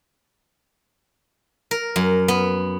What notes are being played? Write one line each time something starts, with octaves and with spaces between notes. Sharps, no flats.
A#4
F#2
B3